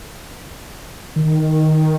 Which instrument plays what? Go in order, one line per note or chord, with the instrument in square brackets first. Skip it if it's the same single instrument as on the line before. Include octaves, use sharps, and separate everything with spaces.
[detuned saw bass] D#3